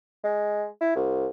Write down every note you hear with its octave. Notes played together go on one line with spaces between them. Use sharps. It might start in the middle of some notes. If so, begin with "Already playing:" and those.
G#3
E4
C2